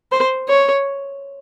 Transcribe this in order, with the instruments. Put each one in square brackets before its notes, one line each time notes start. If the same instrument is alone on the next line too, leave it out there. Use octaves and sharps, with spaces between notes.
[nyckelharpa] C5
C#5